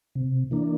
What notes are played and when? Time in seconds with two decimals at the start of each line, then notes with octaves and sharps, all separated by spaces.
0.15 C3
0.51 E3 A#3 D4